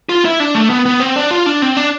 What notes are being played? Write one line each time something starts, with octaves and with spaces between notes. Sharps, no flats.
F4
E4
D4
A3
B3
B3
C4
D4
F4
D4
C4
D4